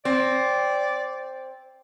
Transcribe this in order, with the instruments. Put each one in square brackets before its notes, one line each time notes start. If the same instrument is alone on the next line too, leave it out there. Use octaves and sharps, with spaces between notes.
[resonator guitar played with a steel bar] C4 [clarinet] D5